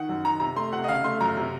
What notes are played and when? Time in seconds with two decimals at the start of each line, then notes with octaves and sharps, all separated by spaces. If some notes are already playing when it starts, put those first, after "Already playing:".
Already playing: D#3 F#5
0.09 F#2
0.24 D#3 A#5
0.40 C3 A#5
0.56 A3 C6
0.72 C3 F#5
0.84 D#5
0.88 C#3 F5
1.04 A3 C6
1.21 F#2 A#5
1.37 C3